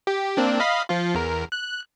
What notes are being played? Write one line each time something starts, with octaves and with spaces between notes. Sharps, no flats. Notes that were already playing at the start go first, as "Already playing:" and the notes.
G4
A#3 C4 D4
D#5 F5 B5
F3 F4
E2 A#4
F#6